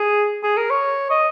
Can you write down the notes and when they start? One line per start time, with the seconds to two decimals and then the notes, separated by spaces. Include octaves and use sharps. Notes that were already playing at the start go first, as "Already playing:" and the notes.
Already playing: G#4
0.43 G#4
0.57 A#4
0.70 C#5
1.10 D#5